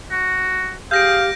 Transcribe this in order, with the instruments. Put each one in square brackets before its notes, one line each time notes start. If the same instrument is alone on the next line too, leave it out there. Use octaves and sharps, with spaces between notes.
[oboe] F#4
[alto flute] G4 [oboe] G#4 [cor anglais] F5 [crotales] G6 A#6 D7